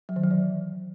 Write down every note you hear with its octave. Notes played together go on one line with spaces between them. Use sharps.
F#3
D#3
F#3
E3